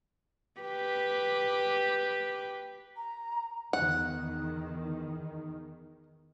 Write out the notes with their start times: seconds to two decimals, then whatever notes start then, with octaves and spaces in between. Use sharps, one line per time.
0.61 G4 B4
2.97 A#5
3.73 E2 D#3 F#5